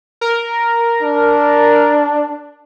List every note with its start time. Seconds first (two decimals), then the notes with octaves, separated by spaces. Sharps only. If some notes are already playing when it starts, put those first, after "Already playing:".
0.21 A#4
1.03 D4